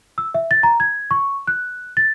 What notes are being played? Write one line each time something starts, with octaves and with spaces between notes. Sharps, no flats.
E6
E5
A6
A#5
G#6
C#6
F#6
A6